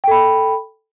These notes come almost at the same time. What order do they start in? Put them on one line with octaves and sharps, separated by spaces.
G5 A4 B5